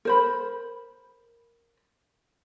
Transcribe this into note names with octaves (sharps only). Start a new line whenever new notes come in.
A#4 C5 B5